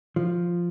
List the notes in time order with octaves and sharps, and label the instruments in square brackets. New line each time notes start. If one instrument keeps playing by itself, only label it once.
[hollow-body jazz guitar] F3